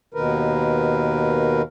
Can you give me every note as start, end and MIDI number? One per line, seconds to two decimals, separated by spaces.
0.14 1.62 39
0.14 1.62 47
0.14 1.62 51
0.14 1.62 70
0.14 1.62 71